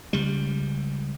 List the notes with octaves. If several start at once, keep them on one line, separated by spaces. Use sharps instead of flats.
C#2 G3